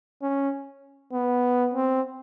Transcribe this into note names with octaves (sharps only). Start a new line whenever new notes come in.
C#4
B3
C4